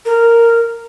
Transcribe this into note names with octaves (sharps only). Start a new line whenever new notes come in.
A#4